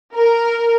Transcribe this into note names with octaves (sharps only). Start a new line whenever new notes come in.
A#4